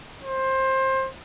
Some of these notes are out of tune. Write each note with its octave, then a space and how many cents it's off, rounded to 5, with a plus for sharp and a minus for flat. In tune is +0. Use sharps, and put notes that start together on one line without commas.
C5 +20